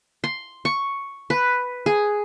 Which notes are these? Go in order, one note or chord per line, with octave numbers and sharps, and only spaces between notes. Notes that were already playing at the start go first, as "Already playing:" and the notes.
C6
C#6
B4
G#4